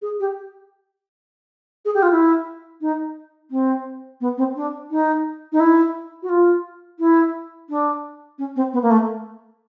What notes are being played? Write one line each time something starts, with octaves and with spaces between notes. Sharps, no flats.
G#4
G4
G#4
G4
F4
E4
D#4
C4
B3
C4
D4
D#4
D#4
E4
F#4
F4
E4
D4
C#4
C4
B3
A#3
A3